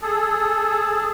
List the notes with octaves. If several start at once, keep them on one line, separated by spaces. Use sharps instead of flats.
G#4 A4